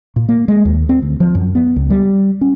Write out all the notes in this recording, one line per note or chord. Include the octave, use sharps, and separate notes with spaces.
A#2
A#3
G#3
D#2
C4
D2
F3
F#2
B3
C#2
G3
C#4